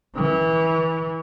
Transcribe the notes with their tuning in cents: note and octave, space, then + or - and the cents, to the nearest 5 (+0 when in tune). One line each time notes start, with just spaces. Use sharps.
E3 -25